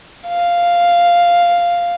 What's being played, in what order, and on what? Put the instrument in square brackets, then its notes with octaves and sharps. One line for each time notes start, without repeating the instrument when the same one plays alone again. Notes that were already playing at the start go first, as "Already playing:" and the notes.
[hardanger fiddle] F5